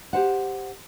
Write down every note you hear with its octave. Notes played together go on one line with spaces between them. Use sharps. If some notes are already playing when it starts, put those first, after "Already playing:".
G4 C5 F#5